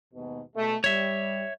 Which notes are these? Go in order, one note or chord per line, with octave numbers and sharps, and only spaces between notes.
D#2 G#2 B2
B2 G#3 A3
G3 C#5 E5